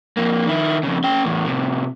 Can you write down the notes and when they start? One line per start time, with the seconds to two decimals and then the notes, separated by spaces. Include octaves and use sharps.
0.17 F2 A#3
0.47 D#3 E4
0.83 F2 C#3
1.04 C#4 G5
1.25 E2 A2
1.46 A2 C3